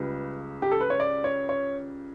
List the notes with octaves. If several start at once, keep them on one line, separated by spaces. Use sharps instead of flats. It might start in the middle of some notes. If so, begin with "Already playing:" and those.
Already playing: C#2 C#3 G3 B4
G4
A4
B4
C#5
D5
C#5
C#5